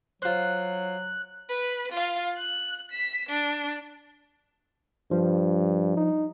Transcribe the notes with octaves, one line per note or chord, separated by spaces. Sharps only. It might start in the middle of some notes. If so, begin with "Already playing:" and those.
F#3 F4 C5 F#6
B4
F4 F5
F#6
B6 E7
D4
G2 F3
D#4